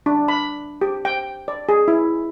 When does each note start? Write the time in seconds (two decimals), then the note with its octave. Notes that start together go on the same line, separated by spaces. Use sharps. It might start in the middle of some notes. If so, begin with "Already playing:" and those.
0.06 D4
0.28 B5
0.81 G4
1.05 G5
1.48 D5
1.69 G#4
1.88 E4